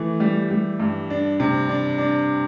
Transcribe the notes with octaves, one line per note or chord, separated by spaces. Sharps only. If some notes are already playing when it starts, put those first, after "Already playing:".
Already playing: E3 A3
G3
G3
G2
D4
C3
D4
D4